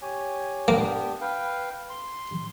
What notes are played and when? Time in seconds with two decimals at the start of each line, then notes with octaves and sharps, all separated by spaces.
0.02 G4 C#5 G#5
0.68 A#3 B3 D4 G4
1.21 B4 F5 G5
1.90 C6